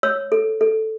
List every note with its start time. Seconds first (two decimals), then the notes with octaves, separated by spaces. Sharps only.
0.03 C#5 E6
0.32 A4
0.61 A4